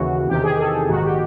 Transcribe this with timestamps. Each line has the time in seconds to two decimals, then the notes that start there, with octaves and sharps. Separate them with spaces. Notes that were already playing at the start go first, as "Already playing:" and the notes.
Already playing: D#2 C#3 E3 F#4
0.27 E2 C3 D#3 G4
0.43 G#4
0.59 A4
0.88 A#1 G#2 D#3 F#4
1.03 G4